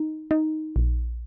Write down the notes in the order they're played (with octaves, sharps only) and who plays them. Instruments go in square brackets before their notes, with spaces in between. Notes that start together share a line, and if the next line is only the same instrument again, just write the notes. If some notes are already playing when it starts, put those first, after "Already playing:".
Already playing: [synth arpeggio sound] D#4
D#4
A#1